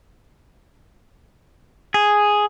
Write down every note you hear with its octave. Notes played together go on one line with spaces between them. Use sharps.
G#4